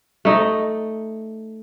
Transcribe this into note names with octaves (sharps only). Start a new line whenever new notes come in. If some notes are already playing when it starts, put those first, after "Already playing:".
A3 D#4 D#5